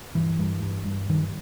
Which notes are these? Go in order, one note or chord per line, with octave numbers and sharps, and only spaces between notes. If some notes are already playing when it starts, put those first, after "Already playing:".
G2 E3
G2
G2
G2
G2 D#3